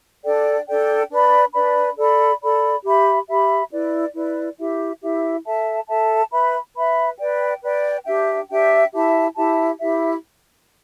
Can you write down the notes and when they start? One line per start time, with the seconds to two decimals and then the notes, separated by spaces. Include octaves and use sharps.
0.24 D4 A4 D5 G5
0.67 D4 A4 D5 G5
1.10 D4 B4 D5 B5
1.54 D4 B4 D5 B5
1.97 A4 D5 B5
2.41 A4 D5 B5
2.84 G4 E5 B5
3.28 G4 E5 B5
3.71 E4 B4 D5
4.14 E4 B4 D5
4.58 E4 G4 E5
5.02 E4 G4 E5
5.45 A4 E5 A5
5.89 A4 E5 A5
6.32 B4 E5 B5
6.76 B4 E5 B5
7.19 B4 D5 G5
7.62 B4 D5 G5
8.06 D4 G4 E5 G5
8.49 D4 G4 E5 G5
8.93 E4 G4 E5 A5
9.36 E4 G4 E5 A5
9.79 E4 G4 E5